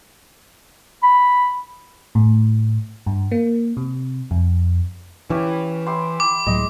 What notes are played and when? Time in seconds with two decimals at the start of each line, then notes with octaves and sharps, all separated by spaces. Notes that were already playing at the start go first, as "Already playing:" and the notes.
1.03 B5
2.15 A2
3.06 G2
3.31 A#3
3.77 C3
4.31 F2
5.30 E3 C#4 G4 C#5
5.86 E4 G4 C6
6.20 D6
6.46 C#2 A2 F#3 G#3 D#5